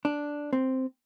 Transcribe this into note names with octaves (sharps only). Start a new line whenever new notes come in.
D4
C4